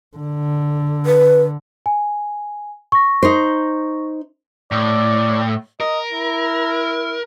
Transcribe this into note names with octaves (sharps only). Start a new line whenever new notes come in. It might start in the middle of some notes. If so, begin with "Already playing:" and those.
D3
B4
G#5
C#6 A#6
D#4 C5
A2 D5
A#4 D#5
E4